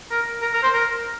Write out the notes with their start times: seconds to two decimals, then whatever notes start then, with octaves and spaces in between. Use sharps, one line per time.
0.11 A#4
0.42 A#4
0.53 A#4
0.63 C5
0.74 A#4